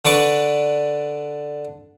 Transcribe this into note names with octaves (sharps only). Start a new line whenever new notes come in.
D3 D4 B4 D5 C#6 D6